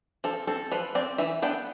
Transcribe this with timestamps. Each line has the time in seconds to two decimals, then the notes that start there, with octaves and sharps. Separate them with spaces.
0.24 F3 A4
0.47 C4 A4
0.72 F3 B4
0.95 C4 D5
1.18 E3 E5
1.42 B3 D4 G5